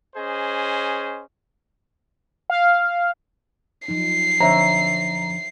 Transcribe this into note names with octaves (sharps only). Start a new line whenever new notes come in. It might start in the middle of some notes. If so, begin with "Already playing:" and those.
C#4 G#4 C5 D#5
F5
F3 F#3 D#4 C7
F2 D3 C5 C#5 E5 A#5